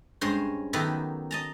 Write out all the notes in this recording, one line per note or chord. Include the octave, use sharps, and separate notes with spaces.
G2 G#3 C#4 C5
D#3 F#3 B3 G4 A4 E5
D#5 A5 A#5